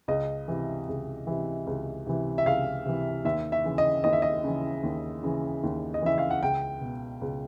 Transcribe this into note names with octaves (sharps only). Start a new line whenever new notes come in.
C#2 D#5
C3 E3
C#2
C3 E3
C#2
C3 E3
E5
C#2 F5
C3 E3
D#2 E5
E5
C#3 E3
D#5
D#2 D#5
E5
D#5
C#3 E3
D#2
C#3 E3
D#2
D#5
C#3 E3 E5
F5
F#5
C#2 G5
B2
C#2